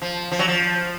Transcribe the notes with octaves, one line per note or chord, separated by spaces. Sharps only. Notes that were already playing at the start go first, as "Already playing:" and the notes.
F3
F3
F#3
F3